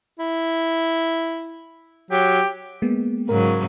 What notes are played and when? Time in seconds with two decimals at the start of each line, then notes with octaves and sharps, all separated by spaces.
0.19 E4
2.11 F#3 G4
2.82 G#3 A#3 B3
3.29 G#2 C#3 F#3 A#4